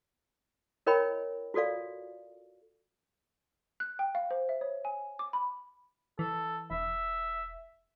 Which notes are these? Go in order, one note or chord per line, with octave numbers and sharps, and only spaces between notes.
E4 A#4 C#5 D#5 G5 B5
F4 F#4 A4 D5 F5
F#6
G5
F5
C5
E5
C#5
G#5
D6
B5
E3 A4
E1 E5